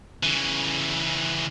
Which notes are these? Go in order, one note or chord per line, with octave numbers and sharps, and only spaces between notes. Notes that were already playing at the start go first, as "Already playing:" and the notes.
C#3 E3